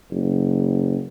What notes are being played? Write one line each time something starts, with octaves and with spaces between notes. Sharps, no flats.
F#1